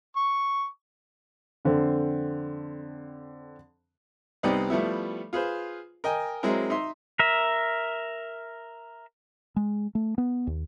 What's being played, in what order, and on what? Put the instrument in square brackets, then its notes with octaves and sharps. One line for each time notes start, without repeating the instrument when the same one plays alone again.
[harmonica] C#6
[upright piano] F2 D3 C4
[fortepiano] C2 B3 C4 D#4 G4 D5
F3 G3 A3 B3 E4
F4 G#4 B4 C5
A#4 D#5 G5 G#5
F#3 G#3 C4 E4 A#4
D#4 E5 C6
[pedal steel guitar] A#4 E5
[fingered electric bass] G#3
A3
B3
D#2